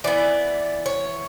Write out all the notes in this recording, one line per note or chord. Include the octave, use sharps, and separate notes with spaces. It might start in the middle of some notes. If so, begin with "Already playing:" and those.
E3 B3 D5
C#5